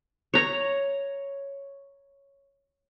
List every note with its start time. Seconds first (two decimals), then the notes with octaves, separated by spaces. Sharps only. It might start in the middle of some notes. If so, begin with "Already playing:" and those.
0.34 C#5 A#5